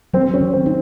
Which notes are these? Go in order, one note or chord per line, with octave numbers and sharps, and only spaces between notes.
F#3 C4
C#4
D#3
C4
D#4